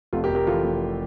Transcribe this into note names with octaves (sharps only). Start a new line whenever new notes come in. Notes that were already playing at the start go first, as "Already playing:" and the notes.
F1 F4 A4
G4 A#4
F1
G4 A#4
E3 F4 A4
F1